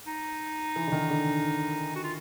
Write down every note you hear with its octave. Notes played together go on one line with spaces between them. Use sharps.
D#4
E3
D3
D#3
D3
F#4
F4